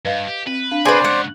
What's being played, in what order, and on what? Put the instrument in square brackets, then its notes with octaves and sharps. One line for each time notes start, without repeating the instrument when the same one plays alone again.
[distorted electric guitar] G2 [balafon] B4 D#5 F5
[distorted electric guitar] G4
[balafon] C4 [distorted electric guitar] B4
[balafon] D4 F5
[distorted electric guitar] B2 C4 [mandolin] G#4 B4 [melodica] C5 D5
[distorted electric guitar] G#2 C#3 [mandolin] F#5